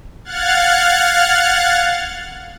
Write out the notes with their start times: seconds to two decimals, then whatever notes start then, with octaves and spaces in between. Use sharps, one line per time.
0.24 F5 F#5 F6 F#6 G#6 A6